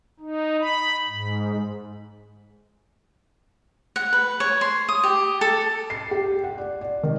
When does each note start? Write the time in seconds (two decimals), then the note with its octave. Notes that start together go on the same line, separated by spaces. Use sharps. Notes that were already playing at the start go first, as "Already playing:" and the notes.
0.20 D#4
0.60 B5
1.08 G#2
3.96 F#5
4.13 B4
4.40 C#5
4.61 C6
4.89 D#6
5.04 G4
5.41 A4
5.90 C7
6.11 G4
6.44 F#5
6.58 D5
6.81 D5
7.03 D#3